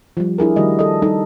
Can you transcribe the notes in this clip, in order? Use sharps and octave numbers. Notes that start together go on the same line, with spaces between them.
F3 G3
D4 E4 G#4 A#4
D#3 G3 A3 F#4 D#5
A4 D#5
G3 D#4 A4